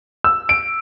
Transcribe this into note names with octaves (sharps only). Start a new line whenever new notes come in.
E6
D7